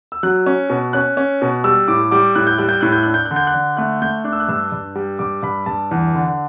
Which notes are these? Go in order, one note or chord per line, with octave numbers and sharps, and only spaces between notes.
E6
F#3 F#6
C#4
B2
C#4 F#6
C#4
B2
G3 E6
A2 D6
G3 D6
A2 F#6
G6
G3 F#6
G6
A2 F#6
G6
D4 F#6
G6
F#6
D3
G6
F#6
D3
A3 F#6
A3 G6
D4 F#6
E6
F#6
G2 E6
G2
G3
G2 D6
G2 B5
G2 A5
E2
D3